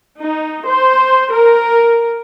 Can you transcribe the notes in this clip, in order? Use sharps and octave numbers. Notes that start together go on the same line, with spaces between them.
D#4
C5
A#4